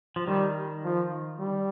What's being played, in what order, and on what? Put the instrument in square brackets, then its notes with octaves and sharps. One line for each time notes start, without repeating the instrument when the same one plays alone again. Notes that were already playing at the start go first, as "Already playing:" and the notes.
[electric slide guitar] F3
[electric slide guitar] D#3 [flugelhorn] G3
[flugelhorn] F3
G3